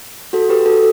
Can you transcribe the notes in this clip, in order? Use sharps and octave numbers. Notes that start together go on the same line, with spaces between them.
F#4 A4
G4 B4
F#4 A4